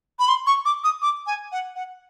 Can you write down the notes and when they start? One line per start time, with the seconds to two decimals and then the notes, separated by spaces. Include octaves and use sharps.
0.19 B5
0.28 C6
0.47 C#6
0.65 D6
0.84 D#6
1.02 D6
1.27 G#5
1.52 F#5
1.75 F#5